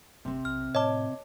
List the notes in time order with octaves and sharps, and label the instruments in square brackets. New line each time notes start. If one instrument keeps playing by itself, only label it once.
[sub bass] G1 [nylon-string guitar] C3 C4
[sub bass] B1 [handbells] F6
[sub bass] A2 [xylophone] C#5 A5 [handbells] D#5 D6